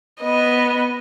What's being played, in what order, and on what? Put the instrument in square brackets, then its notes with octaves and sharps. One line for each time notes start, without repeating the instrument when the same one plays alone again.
[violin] B3 D#5